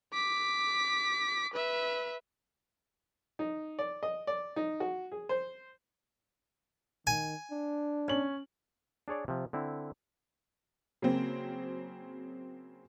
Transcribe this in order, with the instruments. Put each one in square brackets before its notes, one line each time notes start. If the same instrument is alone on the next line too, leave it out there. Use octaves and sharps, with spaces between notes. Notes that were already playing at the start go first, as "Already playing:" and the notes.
[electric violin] D6 B6
B4 E5
[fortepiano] D#4
D5
D#5
D5
D#4
F#4
G#4
C5
[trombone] D#3 [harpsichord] G#5
[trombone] D4
[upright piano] C#4 F#7
[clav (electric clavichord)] D4 G#4 C#5 D5
C3 F3
D3 C4 E4
[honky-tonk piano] C#3 F#3 A#3 C4